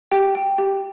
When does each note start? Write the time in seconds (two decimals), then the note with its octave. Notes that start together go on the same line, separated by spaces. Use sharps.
0.11 G4 G5
0.35 G5
0.58 G4